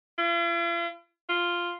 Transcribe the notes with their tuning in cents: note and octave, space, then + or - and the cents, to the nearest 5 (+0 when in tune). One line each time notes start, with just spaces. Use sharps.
F4 -45
F4 -5